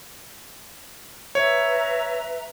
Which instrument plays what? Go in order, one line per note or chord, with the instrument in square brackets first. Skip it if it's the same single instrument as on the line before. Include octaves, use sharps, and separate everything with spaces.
[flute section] B4 E5 A#5 [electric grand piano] C#5